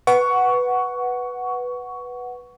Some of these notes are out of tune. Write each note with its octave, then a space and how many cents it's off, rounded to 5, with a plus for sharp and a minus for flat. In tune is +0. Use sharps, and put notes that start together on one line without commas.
B4 +0 F#5 +0 C#6 +15